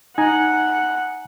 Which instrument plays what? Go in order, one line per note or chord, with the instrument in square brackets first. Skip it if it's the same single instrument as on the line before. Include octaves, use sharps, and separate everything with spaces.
[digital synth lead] D#4 [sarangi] F#5 [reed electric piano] G#5 A#5